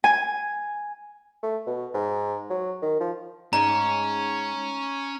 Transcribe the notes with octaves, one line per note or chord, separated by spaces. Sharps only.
G#5
A3
B2
G#2
F#3
D#3
F3
G#2 C#4 A#5